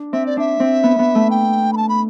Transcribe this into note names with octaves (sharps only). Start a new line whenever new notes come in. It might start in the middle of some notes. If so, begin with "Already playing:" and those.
Already playing: D4
C4 E5
D5
D4 E5
C4
B3
B3
A3
G5
B5
A5
B5